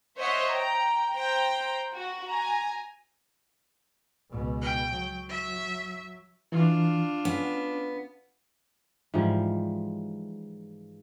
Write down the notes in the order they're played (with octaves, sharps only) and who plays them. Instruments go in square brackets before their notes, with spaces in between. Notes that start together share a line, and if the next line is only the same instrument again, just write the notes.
[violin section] C5 C#5 D#5 E5 F#5 C6
G5 A#5
C5 G5 A#5
F#4
G#5 A#5
[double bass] C#2 B2
[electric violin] G5
[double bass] F#3
[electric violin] E5
[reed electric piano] E3 [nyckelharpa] D4 F4
[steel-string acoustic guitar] B3 [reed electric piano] C#4
[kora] G#2 E3 F3 G3